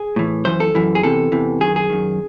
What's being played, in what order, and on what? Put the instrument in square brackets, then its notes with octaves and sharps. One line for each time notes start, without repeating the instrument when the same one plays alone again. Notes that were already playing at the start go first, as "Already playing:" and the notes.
Already playing: [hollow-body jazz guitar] G#4
A2 E3
F#2 E3 C5
A4
F#2 E3
G#4
E2 C3 E3 A4
E2 C3 E3
F#2 D#3 G#4
G#4
F#2 D#3